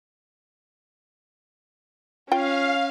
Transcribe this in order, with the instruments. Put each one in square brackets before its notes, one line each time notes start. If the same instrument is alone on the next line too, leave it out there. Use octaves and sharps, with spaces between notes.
[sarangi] C#4 [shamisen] F4 G5 [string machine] F5